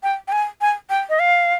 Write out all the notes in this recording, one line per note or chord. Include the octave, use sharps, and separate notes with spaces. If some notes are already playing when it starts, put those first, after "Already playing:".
G5
G5
G#5
G#5
G5
D#5
F5